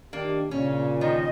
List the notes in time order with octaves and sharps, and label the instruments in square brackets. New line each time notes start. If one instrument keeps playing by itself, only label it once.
[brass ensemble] D#3 G4 [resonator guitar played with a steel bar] A#3 D4
[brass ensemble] A#2 [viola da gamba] C#3 [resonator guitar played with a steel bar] C#4
[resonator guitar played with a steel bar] D#3 F3 [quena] D#5